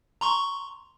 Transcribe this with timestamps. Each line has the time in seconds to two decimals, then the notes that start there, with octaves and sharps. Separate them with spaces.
0.21 A#5 C6 C#6